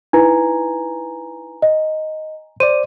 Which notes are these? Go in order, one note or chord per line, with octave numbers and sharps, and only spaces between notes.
D#4 E4 B4 G#5 A#5
D#5
C5 D5 D#7